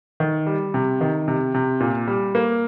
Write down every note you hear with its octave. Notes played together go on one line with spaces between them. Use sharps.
D#3
G3
C3
D#3
C3
C3
A#2
G3
A#3